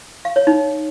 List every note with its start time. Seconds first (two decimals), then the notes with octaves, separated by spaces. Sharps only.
0.25 F5
0.36 C#5
0.47 D#4